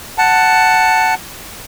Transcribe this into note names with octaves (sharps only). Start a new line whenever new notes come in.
F#5 A5